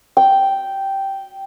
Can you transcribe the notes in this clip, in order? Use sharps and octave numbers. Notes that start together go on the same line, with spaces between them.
G5